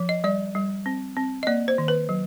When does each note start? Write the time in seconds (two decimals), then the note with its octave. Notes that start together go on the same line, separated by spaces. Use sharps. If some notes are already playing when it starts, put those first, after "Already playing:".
Already playing: F3
0.09 D#5
0.24 G3 D5
0.55 G3
0.86 C4
1.17 C4
1.43 D#5
1.47 A#3 D5
1.68 C5
1.78 D#3
1.88 B4
2.09 F#3